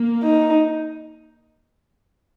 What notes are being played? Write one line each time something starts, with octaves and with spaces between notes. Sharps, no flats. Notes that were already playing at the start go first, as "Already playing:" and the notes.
Already playing: A#3
D#4